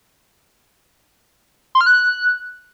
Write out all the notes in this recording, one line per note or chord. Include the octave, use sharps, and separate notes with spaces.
C6
F6
F#6